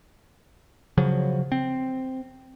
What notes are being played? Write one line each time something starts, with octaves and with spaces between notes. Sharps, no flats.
C#3 F3 F#3
C4